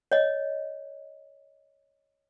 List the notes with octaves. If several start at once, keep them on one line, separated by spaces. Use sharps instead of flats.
C#5 D#5